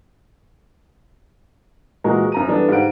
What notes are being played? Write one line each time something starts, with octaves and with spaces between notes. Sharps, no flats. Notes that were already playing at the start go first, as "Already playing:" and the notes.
A#2 E3 G#3 F#4 A#4 A#5
F#2 A#5 D#7
D3 E3 G3 B3 D4 A4
G#2 G4 F5 F#5 D7